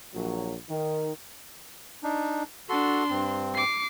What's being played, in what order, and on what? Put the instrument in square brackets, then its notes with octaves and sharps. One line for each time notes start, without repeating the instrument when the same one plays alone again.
[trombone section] A#1 F#3
D#3
[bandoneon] D4 D#4
[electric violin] D4 C6 [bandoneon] F#4 A4
[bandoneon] G2 C4
[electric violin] D6 C7